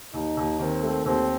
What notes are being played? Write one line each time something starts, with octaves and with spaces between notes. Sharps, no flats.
D#2 D#4
D#2
D#3 C4
A3
D#2 C4